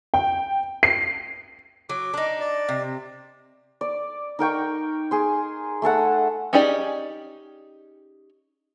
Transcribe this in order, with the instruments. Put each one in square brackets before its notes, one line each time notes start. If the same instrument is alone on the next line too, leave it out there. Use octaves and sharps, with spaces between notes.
[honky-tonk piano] G5
C7
[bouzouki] F#3 [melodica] D6
[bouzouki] D4 D#4
[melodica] D5
[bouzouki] C3
[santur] D5
D#4 A#4 G5 C#6
G#4 C6
A3 G#4 A4 F#5
[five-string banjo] C#4 D#4 G4 G#4 D5